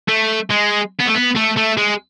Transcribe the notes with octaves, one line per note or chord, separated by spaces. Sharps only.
A3
G#3
B3
A3
B3
A3
A3
G#3